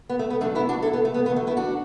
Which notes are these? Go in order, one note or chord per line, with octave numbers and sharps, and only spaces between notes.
B3
A3
B3
F#2 F#3 A3 D4
B3 E4
D4 F#4
E4 A4
B3
A3
B3
E2 D3 F#3 B3
A3
B3 E4
D4 F#4